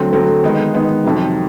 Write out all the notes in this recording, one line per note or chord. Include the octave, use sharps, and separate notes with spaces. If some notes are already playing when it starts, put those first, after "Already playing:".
Already playing: D3 F#3 A3 C4
D3 F#3 A3 C4
D#3 G#3 B3 D#4
D#3 G#3 B3 D#4
F2 C3 D#3 F#3